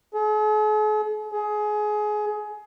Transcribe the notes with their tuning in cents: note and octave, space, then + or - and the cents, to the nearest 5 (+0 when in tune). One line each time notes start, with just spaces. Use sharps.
G#4 +45
G#4 +20